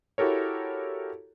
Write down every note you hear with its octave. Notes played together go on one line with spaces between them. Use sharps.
E4 F#4 G4 A4 A#4 C#5